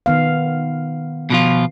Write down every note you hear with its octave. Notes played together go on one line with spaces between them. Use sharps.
D#3 B3 F5
B2 F3 F4